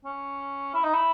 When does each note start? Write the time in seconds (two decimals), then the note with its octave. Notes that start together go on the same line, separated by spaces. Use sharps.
0.05 C#4
0.74 E4
0.84 D#4
0.94 E4